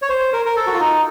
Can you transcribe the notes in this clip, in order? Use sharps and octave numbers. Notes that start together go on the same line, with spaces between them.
C#5
C5
A#4
A#4
A4
F#4
F4
D#4